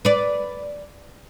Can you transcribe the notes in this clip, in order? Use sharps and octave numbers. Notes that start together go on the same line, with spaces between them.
B4 D5